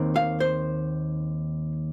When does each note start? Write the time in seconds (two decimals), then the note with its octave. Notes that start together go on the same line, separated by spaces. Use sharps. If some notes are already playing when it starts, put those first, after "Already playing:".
Already playing: D#2 D#3 C4
0.16 F5
0.40 C5